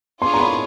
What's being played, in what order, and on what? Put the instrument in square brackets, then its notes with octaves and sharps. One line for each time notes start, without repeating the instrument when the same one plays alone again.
[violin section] D4 F4 G#4 C#5 [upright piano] C6
[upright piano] A#5
B5